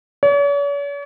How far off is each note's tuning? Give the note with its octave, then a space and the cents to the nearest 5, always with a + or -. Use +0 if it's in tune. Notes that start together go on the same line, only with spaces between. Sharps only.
C#5 +45